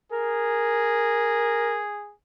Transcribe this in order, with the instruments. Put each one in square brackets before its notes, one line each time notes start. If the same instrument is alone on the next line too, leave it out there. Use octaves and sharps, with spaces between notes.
[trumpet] G#4 [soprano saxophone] A#4